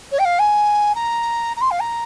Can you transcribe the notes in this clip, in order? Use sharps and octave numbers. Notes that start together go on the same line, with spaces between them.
C#5
G5
F5
G#5
A#5
A#5
C6
F5
A#5